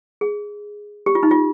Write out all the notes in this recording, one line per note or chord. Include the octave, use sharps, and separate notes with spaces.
G#4
G4
F4
D#4
F4